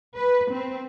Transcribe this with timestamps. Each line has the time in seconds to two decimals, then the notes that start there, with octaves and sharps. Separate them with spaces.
0.16 B4
0.52 C4